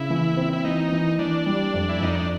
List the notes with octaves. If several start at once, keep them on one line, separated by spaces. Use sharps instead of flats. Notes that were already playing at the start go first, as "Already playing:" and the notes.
Already playing: C#3 E4
E3
C4
E4
E3 D#4
E3
E3 D4
G3
F2
E4
F2 D#4
D4